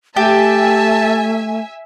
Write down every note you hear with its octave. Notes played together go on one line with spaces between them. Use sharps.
A3 G4 E5 G#5 A5